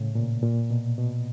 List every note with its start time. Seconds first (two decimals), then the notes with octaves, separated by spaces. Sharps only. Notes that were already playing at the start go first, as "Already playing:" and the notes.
Already playing: A2 C#3
0.15 A#2
0.43 A#2
0.70 B2
0.98 B2